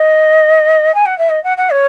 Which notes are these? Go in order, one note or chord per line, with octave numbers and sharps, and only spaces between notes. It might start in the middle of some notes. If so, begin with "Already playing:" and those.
Already playing: D#5
G#5
F#5
E5
D#5
F#5
F#5
C#5